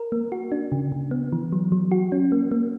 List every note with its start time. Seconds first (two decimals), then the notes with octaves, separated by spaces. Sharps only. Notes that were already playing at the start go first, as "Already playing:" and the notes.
Already playing: A#4
0.12 A#3
0.32 F#4
0.52 D4
0.72 C#3
0.92 C#3
1.11 B3
1.32 E3
1.52 F#3
1.72 F#3
1.92 F#4
2.12 C#4
2.32 A#3
2.51 A#3